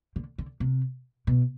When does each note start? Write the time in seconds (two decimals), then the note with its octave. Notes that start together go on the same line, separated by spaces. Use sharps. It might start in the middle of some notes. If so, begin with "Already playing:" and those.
0.16 D3
0.38 D3
0.60 C3
1.27 B2